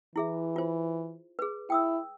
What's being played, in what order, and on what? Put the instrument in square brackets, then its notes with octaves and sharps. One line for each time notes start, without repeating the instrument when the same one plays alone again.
[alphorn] E3 [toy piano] E4 G#4 E5
[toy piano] F4 C5
G#4 B4
[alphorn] E4 [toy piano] G5 D#6 E6